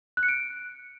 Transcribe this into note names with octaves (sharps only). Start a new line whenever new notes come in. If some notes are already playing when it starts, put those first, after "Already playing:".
F#6
C#7
D7